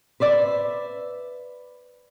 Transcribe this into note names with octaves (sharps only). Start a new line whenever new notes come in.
B4 C5 D5 E5